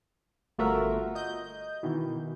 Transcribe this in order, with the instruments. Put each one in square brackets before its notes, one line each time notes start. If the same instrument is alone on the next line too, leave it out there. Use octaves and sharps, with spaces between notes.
[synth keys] G1 A3 F4 F#4 A#4 E5
D#5 G6
B2 D#3 E3